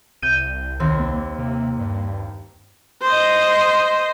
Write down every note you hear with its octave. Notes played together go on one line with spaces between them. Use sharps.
C2 G6 D#7
D#2 C4
A#3
C3
G2
C5 D#5